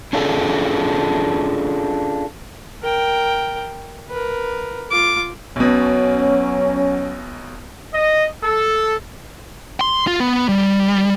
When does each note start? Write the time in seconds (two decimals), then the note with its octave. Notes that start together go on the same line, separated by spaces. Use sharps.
0.13 C#4 D4 F4 G#4 A4
2.83 A#4 G5
4.09 A#4 B4
4.90 F4 D6
5.56 B1 B2 F#3 C#4
7.92 D#5
8.43 A4
9.81 C6
10.07 F4
10.20 B3
10.49 G3